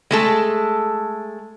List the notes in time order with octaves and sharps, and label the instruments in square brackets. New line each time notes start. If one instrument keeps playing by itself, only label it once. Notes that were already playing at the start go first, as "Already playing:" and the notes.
[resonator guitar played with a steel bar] G#3 A3 A4